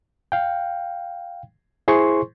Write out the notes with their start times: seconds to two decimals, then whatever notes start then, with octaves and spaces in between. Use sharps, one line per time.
0.32 F5 G5
1.88 E4 G#4 C5 C6 C#6